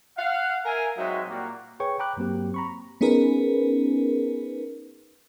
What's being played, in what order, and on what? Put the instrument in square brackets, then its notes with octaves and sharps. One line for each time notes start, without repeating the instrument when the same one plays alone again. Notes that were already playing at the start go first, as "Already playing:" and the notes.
[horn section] F5 F#5
A#4 E5 F5 G#5
F#3 G#3 C4 D#4 F#4 E5
A#2 G3 A#3 F#4
[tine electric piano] G#4 B4 C#5 G5 C#6
G5 A#5 B5 D6 F#6
G2 F#3 A#3 C4 G4
A#5 B5 C#6
[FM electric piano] B3 C#4 D#4 G#4 A#4 B4